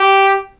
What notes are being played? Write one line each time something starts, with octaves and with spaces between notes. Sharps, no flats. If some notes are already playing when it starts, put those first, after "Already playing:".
Already playing: G4